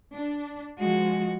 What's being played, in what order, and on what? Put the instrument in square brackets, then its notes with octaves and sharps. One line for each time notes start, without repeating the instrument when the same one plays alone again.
[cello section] D4
[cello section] F3 G#3 [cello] F#4